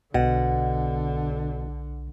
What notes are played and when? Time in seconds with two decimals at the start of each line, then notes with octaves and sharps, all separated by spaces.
0.14 B1 B2 D3 F#5